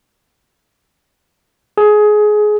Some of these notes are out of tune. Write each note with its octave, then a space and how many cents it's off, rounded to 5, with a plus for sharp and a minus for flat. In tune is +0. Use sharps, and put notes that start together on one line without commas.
G#4 +20